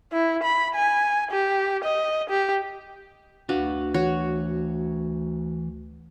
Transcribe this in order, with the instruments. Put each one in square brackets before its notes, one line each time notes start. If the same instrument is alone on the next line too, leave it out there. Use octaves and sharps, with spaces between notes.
[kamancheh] E4
B5
G#5
G4
D#5
G4
[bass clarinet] D2 [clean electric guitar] D4 B4 F5 [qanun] F#4
[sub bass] E3 [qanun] F#4 C#5